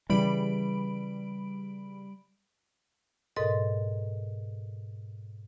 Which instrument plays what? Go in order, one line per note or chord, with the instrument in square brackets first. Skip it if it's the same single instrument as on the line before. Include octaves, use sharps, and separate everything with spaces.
[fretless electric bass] C#3 E3 [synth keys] G3 B5 D7
[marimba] G#2 B2 A4 A#4 D#5